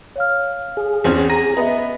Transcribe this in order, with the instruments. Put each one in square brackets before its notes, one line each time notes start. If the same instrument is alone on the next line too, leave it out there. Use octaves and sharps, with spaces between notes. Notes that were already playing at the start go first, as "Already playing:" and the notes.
[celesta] C#5 F5 F6
[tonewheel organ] G#4
[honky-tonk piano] E2 C4 C#4
[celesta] A#5 D#7 [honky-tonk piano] A#6
[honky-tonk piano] B3 [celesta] D#5 E5